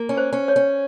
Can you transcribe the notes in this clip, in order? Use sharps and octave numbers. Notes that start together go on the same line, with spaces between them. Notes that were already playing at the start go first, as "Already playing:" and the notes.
Already playing: A#3
C#4
C5
C#4
C#5
C#4